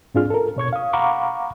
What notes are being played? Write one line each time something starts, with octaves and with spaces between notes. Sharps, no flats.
G#2 C4 D4 F4 G#4 F6
A4 A#4
B2 C#5 C#6 G#6
F5 D#6
F5 F#5 A#5 B5 C#6 D6